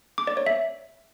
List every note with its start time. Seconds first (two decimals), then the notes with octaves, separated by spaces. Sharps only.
0.18 D6
0.27 D5
0.37 C#5
0.46 E5